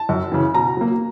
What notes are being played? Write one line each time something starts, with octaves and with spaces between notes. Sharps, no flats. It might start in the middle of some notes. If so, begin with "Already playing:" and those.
Already playing: A5
F#2
C#3 E3
B2 A#5
F#3 A#3